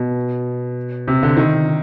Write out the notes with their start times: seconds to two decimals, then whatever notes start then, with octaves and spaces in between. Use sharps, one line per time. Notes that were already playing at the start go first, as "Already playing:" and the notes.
Already playing: B2
1.08 C3
1.23 D3
1.37 D#3